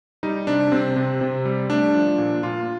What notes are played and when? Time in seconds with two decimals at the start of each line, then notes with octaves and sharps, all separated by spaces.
0.23 G3 D#4
0.47 C3 D4
0.72 C3 C4
0.96 C3
1.21 C3
1.45 G3
1.69 A3 D4
1.94 F3
2.18 A#2
2.43 A#2 F4